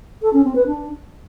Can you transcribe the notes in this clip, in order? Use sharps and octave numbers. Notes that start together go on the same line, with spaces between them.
A4
C#4
C4
B4
D4